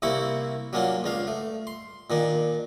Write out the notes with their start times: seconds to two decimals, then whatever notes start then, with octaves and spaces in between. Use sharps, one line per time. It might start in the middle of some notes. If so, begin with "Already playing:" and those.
0.02 C2 C3 A#3 C4 E4 C#6
0.73 F#3 A#3 C#4 D4 F4
1.04 C#2 D4 F5
1.27 A3
1.67 C6
2.10 A#2 D#3 D4